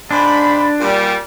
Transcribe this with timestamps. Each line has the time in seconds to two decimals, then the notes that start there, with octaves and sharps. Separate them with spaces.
0.11 G#2 D4 B5
0.81 A#2 G3